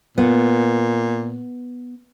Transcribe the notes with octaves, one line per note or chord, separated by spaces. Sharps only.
A#2 B3